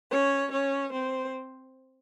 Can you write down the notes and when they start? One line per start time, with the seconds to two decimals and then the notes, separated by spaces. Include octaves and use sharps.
0.11 C#4 C#5
0.52 C#4 C#5
0.92 C4 C5